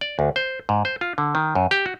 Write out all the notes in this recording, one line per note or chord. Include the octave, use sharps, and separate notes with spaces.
D5
D2
C5
G#2
C5
F4
D3
D#3
F#2
G4
F#4